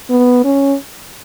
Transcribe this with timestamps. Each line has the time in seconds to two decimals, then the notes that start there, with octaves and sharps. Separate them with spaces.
0.10 B3
0.44 C#4